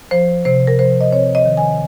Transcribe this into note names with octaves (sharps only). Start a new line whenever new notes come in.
F3 C5
C3 C5
A#4
F3 C5
D#5
C4 C#5
D#5
D#3
G#5